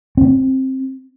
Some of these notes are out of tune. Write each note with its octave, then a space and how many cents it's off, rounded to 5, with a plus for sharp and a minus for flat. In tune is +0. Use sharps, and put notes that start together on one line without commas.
C4 +15